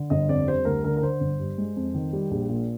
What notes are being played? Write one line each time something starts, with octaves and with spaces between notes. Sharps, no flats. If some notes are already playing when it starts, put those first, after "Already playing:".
Already playing: D3
G1 D#5
F2 D5
G3 C5
D2 A#4
D3 A#4
A#4
D3 C5
G1
G2
G#3
F2
D#3
G3
A#1
A#2